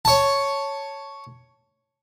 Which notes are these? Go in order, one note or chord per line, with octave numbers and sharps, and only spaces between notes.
C#5 A5